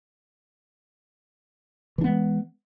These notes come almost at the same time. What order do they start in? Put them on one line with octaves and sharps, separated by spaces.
E3 D4 B3 G#3